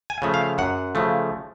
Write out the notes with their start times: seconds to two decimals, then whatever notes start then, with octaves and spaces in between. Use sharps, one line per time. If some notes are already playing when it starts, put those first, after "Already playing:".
0.10 G#5
0.22 C#3 F3 A3
0.34 F5
0.58 F#2 F#5
0.95 C#3 F3 A3